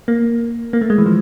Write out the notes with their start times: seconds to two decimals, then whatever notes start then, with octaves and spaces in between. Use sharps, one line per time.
0.08 A#3
0.73 A#3
0.81 A3
0.90 G#3
0.98 E3
1.06 F3